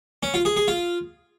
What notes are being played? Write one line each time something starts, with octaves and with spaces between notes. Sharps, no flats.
C#4
F4
G#4
G#4
F4